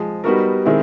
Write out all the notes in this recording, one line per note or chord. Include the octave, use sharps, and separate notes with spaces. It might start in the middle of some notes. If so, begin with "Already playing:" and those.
Already playing: F3 G#3
G3 B3 D#4 F#4 A#4
D#3 G#3 C4 E4